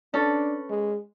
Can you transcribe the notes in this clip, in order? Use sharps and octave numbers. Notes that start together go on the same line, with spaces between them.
C#4 D4 A4 B4
G#3